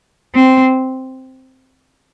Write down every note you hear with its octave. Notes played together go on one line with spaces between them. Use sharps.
C4